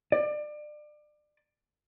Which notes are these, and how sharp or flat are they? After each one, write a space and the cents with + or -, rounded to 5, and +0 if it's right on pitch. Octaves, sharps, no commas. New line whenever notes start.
D5 +30